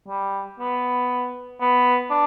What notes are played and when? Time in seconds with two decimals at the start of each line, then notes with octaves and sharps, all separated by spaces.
0.08 G3
0.60 B3
1.60 B3
2.10 D4